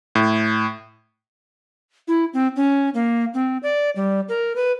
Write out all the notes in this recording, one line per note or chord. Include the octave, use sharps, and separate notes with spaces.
A2
E4
C4
C#4
A#3
C4
D5
G3
A#4
B4